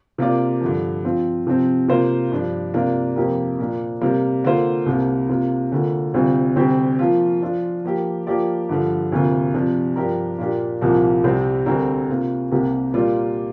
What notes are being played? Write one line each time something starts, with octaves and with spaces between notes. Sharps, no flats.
C3 A#3 F4 D5
G2 D3 F3
F3 C4 F4
C3 F3 C4
C3 A#3 F4 C5
G2 F3 D4
C3 A#3 D4 F4
F2 C3 A#3 G4 A#4
A#2 A#3 D4
C3 G3 A#3
D3 A#3 F4 C5
C2 C3 A#3
C3 A#3 F4
D2 D3 A#3 F4
D2 C3 G3 C4 F4
D2 C3 G3 C4 G4
F3 A#3 F4
F3 D4 F4
F3 A#3 G4
F3 A#3 G4 D5
G2 D3 F3
D2 C3 A#3 F4
C3 F3 D4
G2 F3 D4 G4 A#4
A#2 A#3 D4 G4
C2 A#2 F3 A#3
C2 C3 G3 C4
D2 D3 G3 C4 A#4
C3 A#3 F4
C2 C3 A#3 G4 A#4
A#2 G3 A#3 F4 D5